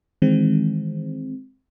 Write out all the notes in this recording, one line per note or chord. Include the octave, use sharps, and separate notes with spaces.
D#3 E3 G#3 C4